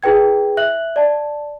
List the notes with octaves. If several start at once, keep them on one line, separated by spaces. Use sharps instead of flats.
E4 G#4 B4 G5 G#6
E5 F#6 F#7
D5 A5